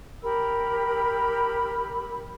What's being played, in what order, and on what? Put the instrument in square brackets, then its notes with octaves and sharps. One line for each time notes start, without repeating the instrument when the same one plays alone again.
[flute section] G4 A#4 B5 E6